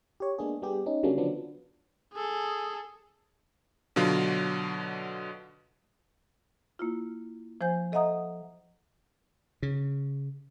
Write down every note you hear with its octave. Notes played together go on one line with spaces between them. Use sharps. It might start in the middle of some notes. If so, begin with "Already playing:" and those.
G4 C#5
G#3 A#3 B3 D4 G#4
G3 B3 G4 G#4
C#4 D#4
C#3 F#3 G3 A#3 C#4 D4
D3 F3 F#3 B3 D4
G#4 A4
B2 D3 F#3 F4
A#3 E4 F4
F3 C5 G#5 G6
A4 D#5 E5 F#5 A#5 D#6
C#3